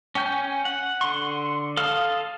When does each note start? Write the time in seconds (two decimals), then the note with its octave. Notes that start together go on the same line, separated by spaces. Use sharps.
0.15 C#4 G5 G#5 G6
0.65 F#5
1.01 D3 C6 C#6
1.77 A4 F5 D#6 F6